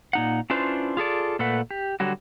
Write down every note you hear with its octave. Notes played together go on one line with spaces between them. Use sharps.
A#2 D#4 F#5
C#4 D4 E4 F4 B4 C5
F4 G#4 A4 D5
A#2 A3 A4 B4 F#5
G4
D3 F#3 G3 F#4